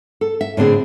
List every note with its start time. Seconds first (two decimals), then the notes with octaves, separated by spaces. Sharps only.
0.21 A4
0.41 E5
0.57 A2 D3 C4 G#4